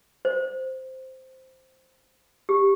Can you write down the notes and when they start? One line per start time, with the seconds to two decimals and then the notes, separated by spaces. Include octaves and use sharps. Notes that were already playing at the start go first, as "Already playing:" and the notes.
0.25 C5
2.49 G4